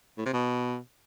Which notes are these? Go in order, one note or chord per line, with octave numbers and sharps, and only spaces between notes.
A2
C3
B2